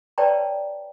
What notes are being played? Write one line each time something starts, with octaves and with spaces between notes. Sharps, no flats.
B4 C#5 D5 G5 A5 A#5